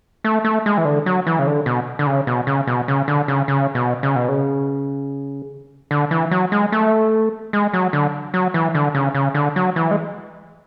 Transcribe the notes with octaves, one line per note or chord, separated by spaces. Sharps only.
A3
A3
G#3
E3
D3
F#3
E3
C#3
D3
B2
D3
C#3
B2
C#3
B2
C#3
D3
C#3
C#3
B2
C#3
B2
C#3
D3
E3
F#3
G#3
A3
G#3
F#3
D3
F#3
E3
D3
C#3
C#3
D3
F#3
E3
G#3